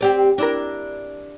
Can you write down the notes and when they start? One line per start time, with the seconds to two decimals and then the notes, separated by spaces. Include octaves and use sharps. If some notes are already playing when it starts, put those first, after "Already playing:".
0.01 C4 G4 D5
0.38 D4 E4 A#4